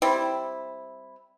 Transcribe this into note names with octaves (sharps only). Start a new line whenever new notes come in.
G3 C4 E4